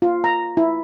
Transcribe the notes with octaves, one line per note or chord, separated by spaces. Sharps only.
F4
A#5
E4